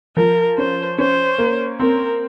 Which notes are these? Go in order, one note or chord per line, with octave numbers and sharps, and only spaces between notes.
F3 A#4
C#4 C5
C#4 C5
A#3
C4 A#4